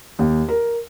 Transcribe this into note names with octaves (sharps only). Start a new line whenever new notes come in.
D#2
A#4